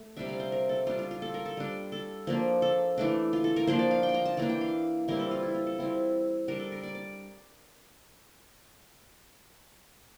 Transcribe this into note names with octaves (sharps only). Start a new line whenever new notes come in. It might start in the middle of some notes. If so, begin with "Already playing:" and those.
Already playing: A3
C3 G3 D4 E5
F5
C5
A#4
A4
G3 D4 F4
F4
F4
A4
A#4
A4
G3 D4
A4
F3 A#3 D4
A4
E3 A3 D4
F4
A4
A#4
F3 A#3 D4 C5
D5
F5
G5
C6
A#5
A5
E3 A#3 D4 A#5
G5
F5
E3 G3 C4 E4 A#4
A4
F4
E4
F4
A4
G3 C4 E4
G3 D4 A#4
A4
A#4
D5
D5